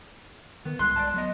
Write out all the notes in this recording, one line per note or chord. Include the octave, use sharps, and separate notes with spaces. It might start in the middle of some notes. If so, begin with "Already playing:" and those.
D#3 B3
C2 G#2 C6 F#6
D5 D#5 A5
F#3 B3 D#5